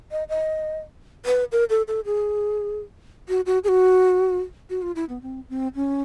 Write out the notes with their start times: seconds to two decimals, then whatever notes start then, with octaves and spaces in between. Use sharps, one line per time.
0.11 D#5
0.29 D#5
1.26 B4
1.52 A#4
1.70 A4
1.88 A4
2.05 G#4
3.29 F#4
3.46 F#4
3.64 G#4
3.68 F#4
4.70 F#4
4.82 F4
4.96 E4
5.09 B3
5.22 C4
5.49 C4
5.75 C#4